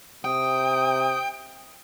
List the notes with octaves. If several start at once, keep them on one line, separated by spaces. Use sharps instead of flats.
C3 G5 D#6